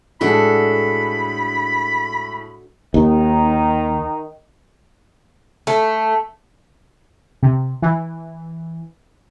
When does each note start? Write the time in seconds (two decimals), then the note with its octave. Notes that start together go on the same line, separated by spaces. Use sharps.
0.21 A2 G#3 D4 F#4 A4 B5
2.94 D#2 D#3 D#4
5.67 A3
7.43 C3
7.82 E3